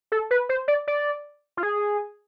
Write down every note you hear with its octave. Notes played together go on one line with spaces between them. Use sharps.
A4
B4
C5
D5
D5
F4
G#4